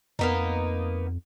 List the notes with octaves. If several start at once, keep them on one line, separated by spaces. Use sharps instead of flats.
F2 A#3 B3 D#4